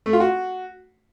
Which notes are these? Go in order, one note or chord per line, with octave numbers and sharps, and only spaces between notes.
A3
F4
F#4